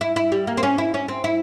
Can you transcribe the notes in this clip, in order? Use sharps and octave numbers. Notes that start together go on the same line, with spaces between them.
E4
E4
G3
A#3
C4
C#4
E4
C#4
C4
E4